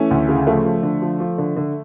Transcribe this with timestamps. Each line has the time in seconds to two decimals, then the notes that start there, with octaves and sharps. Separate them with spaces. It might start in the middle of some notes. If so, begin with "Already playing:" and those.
Already playing: E3 A3 C#4
0.11 D2
0.29 C#3
0.47 F3 A3
0.65 F3
0.83 D3
1.02 F3
1.20 F3
1.38 D3
1.56 D3